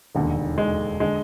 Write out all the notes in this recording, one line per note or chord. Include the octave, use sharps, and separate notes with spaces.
E1 D#2 D3
G#3
D3 G#3